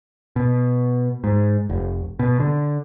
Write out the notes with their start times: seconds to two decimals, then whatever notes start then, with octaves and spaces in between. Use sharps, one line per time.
0.36 B2
1.24 G#2
1.69 F1
2.19 B2
2.40 D3